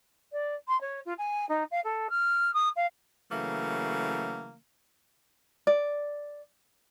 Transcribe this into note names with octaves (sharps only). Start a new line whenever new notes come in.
D5
C6
C#5
F4
G#5
D#4
F5
A4
F6
D#6
F5
C#3 E3 F#3 A3 A#3
D5